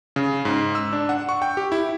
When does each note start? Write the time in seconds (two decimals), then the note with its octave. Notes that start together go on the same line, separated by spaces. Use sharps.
0.16 C#3
0.45 G#2
0.75 E6
0.93 D4
1.09 F#5
1.29 C#6
1.42 G5
1.57 G4
1.72 E4